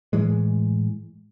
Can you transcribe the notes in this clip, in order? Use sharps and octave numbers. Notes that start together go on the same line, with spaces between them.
A2 E3 G#3